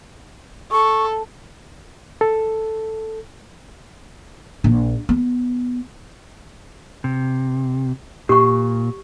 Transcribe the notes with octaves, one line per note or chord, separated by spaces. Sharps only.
A4 C#6
A4
A#1
B3
C3
A#2 G4 C#6